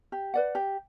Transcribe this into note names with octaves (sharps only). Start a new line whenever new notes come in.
G4
B4 D5 F#5
G4